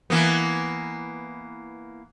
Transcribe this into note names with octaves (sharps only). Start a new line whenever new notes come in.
E3 A#3 B3